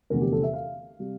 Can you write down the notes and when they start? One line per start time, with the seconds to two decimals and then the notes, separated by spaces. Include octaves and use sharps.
0.10 F1 E2 D3 A3 A#4
0.21 G4
0.32 A4
0.43 E5
0.53 F5
0.99 C3 G3